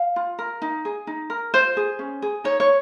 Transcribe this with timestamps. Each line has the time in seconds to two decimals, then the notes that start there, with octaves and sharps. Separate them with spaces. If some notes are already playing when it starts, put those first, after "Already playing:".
Already playing: F5
0.16 F4
0.39 A#4
0.62 D#4
0.85 G#4
1.07 D#4
1.30 A#4
1.54 F4 C5
1.77 G#4
1.99 C#4
2.22 G#4
2.44 D#4 C#5
2.60 C#5